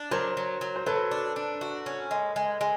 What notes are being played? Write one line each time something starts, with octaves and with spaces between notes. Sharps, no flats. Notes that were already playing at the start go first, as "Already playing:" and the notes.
Already playing: D4
F#3 A#4 C5
F#3
F#3
C5
F#3 A4 B4
D4
D4
F#4
C#4
G#3
G#3
G#3